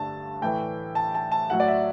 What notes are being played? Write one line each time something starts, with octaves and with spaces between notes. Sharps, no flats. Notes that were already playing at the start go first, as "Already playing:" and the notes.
Already playing: G2 D3 A3 A5
A2 E3 A3 G5
A5
A5
A5
A2 F#3 A3 F#5
D5
E5